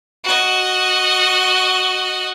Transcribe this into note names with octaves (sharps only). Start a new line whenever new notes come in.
F#4 D#5